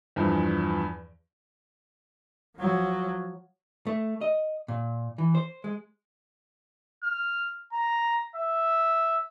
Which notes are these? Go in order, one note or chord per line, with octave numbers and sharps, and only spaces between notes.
E2 G2 E3 F3
F3 F#3
A3
D#5
A#2
E3
C5
G#3
F6
A#5
E5